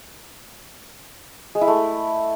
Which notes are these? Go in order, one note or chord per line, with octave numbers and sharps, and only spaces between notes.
G#3
E4
A3